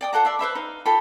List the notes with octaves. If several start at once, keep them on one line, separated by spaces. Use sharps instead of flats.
D5 G5 D#6
F4 A4 F#5 A#5
D5 E5 C6
B4 C5 E5 B5
D#4 F5
F4 A4 G5 B5